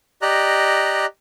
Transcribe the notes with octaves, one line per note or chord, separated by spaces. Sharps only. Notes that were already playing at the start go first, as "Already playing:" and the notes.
G4 D5 D#5 A#5 F#6